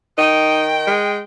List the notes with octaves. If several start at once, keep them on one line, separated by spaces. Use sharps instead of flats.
D#3 D#4 G5
G#3